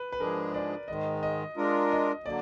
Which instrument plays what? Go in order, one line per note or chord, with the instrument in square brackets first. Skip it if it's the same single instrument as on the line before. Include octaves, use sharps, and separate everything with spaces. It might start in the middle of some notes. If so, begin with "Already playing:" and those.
Already playing: [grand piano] B4
B4
[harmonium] G#2 F3 G#3 D4 G#4 [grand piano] A#4
[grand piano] D5
[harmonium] G#2 D#3 G#3 [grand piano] D#5
[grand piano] D#5
[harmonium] G#3 D4 F4 A#4
[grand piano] D#5
[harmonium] D3 F#3 A#3 [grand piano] D5